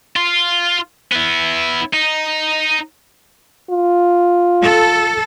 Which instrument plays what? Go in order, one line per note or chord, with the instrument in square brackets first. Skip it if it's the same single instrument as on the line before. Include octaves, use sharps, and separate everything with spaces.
[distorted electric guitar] F4
B3 E4
D#4
[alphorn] F4
[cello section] A4